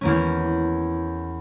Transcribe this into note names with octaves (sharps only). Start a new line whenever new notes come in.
E2 A#3 C#4